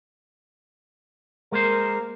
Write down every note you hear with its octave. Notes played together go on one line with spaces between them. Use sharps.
G#3 A#3 A#4 C5